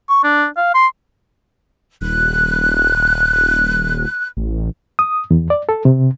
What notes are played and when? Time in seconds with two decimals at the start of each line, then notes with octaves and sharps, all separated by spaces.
0.09 C#6
0.24 D4
0.57 F5
0.74 C6
2.01 D#1 F#6
4.37 A1
4.99 D#6
5.31 E2
5.50 D5
5.69 A4
5.85 C3